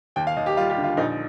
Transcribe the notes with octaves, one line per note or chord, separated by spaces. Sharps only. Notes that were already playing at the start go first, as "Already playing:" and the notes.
D#2 G5
F5
D#2 D#5
G4
G3 F4
G4
D3
F4
A#1 D#4